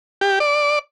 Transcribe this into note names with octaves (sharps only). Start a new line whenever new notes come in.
G4
D5